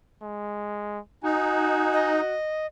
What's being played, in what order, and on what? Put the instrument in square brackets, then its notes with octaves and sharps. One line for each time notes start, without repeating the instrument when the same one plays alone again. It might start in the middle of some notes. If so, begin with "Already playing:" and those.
[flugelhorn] G#3
[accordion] D#4 [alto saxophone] F#4 [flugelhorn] G#5
[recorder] D#5